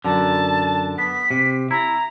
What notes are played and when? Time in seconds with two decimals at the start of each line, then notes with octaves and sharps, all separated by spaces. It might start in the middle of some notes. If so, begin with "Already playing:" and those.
0.05 F#2 D3 A5
0.98 B3 B6
1.31 C3
1.71 E4 A#5